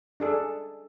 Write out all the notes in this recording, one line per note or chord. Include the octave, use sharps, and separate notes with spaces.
D4 G#4 A4